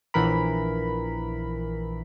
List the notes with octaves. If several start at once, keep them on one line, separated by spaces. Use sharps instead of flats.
A#1 E3 A#4 B5